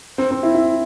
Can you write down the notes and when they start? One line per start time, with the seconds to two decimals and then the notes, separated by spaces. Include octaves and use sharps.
0.18 C4
0.31 C4
0.43 E4
0.55 E4